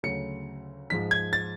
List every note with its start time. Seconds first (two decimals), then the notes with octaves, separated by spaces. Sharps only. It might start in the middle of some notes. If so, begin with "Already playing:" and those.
0.03 D2 C#3 F#3 A3 C#7
0.90 G#2 F3 G#3 B6
1.11 G#6
1.33 A6